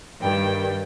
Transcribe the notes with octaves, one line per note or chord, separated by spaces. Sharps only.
G2 D#3 G5